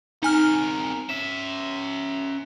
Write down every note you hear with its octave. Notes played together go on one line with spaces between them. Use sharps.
C3 D#4 A#4 G#5 F6
C#4 E5 E7